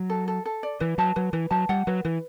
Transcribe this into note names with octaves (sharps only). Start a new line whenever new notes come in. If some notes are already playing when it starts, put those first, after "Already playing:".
Already playing: F#3
A4
A4
A4
D5
E3 B4
F#3 A5
F#3 B4
E3 B4
F#3 A5
G3 F#5
F#3 B4
E3 B4